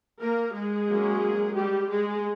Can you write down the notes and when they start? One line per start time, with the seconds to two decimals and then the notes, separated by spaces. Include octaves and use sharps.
0.20 A#3 A#4
0.53 G#3 G#4
0.88 F#3 A#3 C#4
1.55 G3 G4
1.89 G#3 G#4